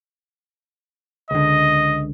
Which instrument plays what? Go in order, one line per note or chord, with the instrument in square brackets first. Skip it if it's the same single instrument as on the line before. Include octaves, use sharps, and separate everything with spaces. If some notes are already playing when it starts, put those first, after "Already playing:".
[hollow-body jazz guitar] C#2 D3 [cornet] D#5